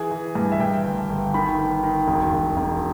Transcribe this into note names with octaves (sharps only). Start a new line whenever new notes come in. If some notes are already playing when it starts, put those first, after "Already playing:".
Already playing: E3 G#4
E3
G2
E5
G2 G5
G1
G1
D#3 B5
D#3
D#3
E1
E1
E1